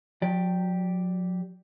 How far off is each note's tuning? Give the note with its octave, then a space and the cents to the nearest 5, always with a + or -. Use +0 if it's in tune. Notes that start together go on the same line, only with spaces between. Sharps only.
F#3 -40 G4 +0 D5 +0